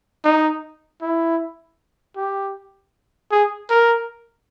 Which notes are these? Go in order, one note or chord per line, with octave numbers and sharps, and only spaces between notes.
D#4
E4
G4
G#4
A#4